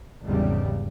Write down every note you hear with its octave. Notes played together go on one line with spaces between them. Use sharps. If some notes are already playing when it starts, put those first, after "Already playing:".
G#1 E2 C#3 G3